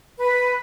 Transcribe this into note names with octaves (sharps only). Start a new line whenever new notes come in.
B4